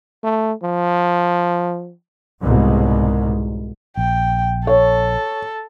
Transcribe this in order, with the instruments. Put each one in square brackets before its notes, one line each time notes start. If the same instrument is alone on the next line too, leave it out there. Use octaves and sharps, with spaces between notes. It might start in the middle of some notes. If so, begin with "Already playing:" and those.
[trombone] A3
F3
[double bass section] C2 G#2 B2
[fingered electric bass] A#1 [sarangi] G5
[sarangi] A4 [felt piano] C#5